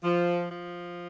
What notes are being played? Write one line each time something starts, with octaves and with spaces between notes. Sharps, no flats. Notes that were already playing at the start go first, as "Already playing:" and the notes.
F3
F3